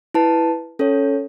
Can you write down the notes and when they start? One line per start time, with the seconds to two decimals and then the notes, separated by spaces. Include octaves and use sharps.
0.14 E4 B4 A5
0.79 C#4 A4 C#5